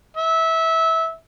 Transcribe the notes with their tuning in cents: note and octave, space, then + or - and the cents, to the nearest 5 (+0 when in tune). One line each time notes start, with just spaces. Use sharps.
E5 -20